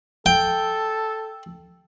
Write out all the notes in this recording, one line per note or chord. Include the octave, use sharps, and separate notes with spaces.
A4 G5